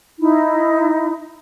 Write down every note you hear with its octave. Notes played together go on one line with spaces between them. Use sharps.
D#4 E4